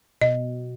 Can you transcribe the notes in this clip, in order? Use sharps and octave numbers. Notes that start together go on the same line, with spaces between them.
B2 D#5